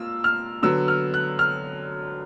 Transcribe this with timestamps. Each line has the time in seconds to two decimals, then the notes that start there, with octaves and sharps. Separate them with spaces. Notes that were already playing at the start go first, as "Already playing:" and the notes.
Already playing: A#3 F4 E6
0.24 F6
0.62 D3 F#3 B3 E6
0.88 F6
1.14 F#6
1.39 F6